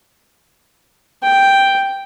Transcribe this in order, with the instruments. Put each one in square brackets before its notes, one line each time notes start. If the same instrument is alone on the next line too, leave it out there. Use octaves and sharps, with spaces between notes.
[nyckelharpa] G5